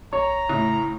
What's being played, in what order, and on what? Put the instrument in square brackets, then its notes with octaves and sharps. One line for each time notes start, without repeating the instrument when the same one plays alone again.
[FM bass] B1 [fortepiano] C#5 [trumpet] A#5
[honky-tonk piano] A2 C#3 [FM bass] E4